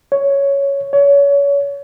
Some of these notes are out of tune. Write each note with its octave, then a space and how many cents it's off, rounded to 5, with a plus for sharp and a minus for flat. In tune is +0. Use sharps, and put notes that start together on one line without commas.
C#5 +5
C#5 +30